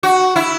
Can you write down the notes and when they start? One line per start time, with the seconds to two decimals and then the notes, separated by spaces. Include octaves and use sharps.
0.03 F#4
0.36 E4